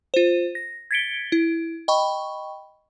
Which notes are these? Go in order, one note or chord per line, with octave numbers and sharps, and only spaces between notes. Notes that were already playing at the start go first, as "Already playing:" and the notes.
F4 C5
A#6
G#6 A6 B6 C#7 D7 G7
E4
D#5 G5 B5 C#6